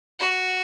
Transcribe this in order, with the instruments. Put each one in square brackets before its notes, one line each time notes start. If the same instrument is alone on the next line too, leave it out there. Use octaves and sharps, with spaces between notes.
[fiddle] F#4